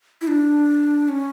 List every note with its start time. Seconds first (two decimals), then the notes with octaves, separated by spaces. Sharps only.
0.21 E4
0.28 D4
1.09 C#4